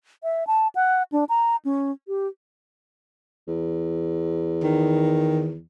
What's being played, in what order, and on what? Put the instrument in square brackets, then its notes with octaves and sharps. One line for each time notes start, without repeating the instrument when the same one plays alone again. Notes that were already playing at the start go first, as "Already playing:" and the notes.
[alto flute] E5
A5
F#5
D4
A#5
C#4
G4
[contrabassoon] E2
[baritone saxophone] D#3